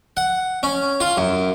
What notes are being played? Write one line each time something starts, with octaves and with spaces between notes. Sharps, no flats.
F#5
C#4
F4
F#2